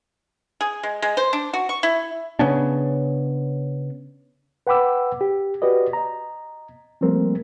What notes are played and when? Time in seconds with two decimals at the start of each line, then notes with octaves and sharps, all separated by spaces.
0.61 G#4
0.83 G#3
1.02 G#3
1.17 C5
1.33 D4
1.54 F#4
1.69 C#6
1.83 E4
2.39 C#3 B3 C#4 D4
4.67 B4 F#5 G5 B5 D6 E6
5.21 G4
5.62 F#4 G4 B4 D5 D#5
5.93 D#5 A#5
7.01 F3 G3 A3 A#3 C4 A#4